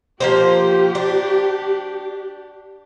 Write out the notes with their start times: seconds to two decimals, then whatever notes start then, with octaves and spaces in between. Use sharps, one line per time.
0.20 F3 A#3 G4 C5
0.95 D4